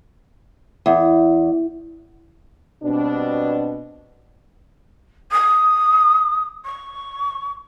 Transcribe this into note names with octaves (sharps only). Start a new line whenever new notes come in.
E2
B2 G3 C4 D4
D#6
C#6